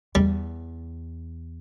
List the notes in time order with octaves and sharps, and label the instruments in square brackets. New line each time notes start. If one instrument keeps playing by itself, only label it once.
[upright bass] E2 [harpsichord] G3